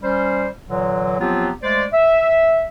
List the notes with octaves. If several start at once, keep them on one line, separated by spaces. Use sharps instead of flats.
G3 C#4 C5
A#2 D3 E3 F#3
F3 F#3 B3 C4 F4 G4
G#3 A3 C5 D5
E5